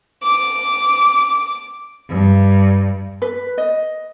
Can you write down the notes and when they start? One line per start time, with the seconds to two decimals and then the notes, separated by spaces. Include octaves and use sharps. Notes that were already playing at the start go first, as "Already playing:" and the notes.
0.23 D6
2.10 G2
3.22 B4
3.58 D#5